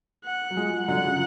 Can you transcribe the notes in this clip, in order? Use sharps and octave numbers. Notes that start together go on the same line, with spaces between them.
F#5
F#3
F3 G#3
D3 F#3 F#5
C#3 F3